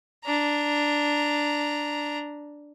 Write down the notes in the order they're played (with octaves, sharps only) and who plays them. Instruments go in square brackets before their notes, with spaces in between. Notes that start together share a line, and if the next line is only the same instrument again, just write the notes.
[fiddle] D4 A#5